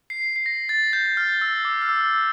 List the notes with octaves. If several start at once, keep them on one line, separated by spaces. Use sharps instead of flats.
C7
C7
A#6
A6
G6
G6
F6
E6
D6
F6
E6